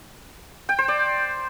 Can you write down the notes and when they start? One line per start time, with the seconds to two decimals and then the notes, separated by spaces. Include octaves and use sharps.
0.69 G5
0.78 C5
0.88 D5